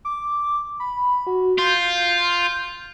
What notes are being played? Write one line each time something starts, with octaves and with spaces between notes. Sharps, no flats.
D6
B5
F#4
F4 G6